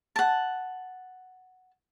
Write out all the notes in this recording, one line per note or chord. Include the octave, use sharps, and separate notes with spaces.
F#5 A5